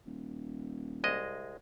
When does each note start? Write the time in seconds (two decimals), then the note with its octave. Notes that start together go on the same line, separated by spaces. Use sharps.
0.06 D#1
1.04 C2 G#3 D#5